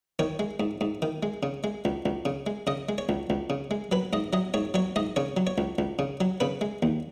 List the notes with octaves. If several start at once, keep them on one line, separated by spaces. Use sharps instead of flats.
D#3 C#5
G#3
G#2
G#2
D#3
G#3
C#3
G#3
C#2
C#2
C#3
G#3
C#3 D#5
G#3
C#5
C#2
C#2
C#3
G#3
F#3 B4
G#2 D#5
F#3 D#5
G#2 C#5
F#3 C#5
G#2 D#5
C#3 C#5
F#3
C#5
C#2
C#2
C#3
F#3
C#3 B4
G#3
D#2